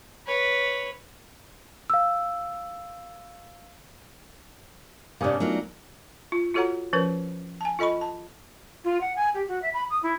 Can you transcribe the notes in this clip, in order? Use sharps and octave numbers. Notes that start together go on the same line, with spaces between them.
B4 C#5
F5 E6
A2 C3 A#3 C#4 D4 F5 G#5 D#6
F#3 A3 B3 D#4 F4 A#4
F4
F4 F#4 A4 C#5 F#5 A#5
F3 C#4 A#4 B4 C#5
G#5 A5
F4 A4 D#5 B5 C#6
A5
F4
F#5
G#5
G4
F#4
E5
B5
D#6
E4